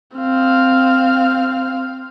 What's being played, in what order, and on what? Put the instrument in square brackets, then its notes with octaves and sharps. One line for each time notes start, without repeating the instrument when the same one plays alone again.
[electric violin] C4 F5